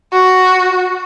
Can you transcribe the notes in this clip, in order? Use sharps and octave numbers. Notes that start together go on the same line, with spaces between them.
F#4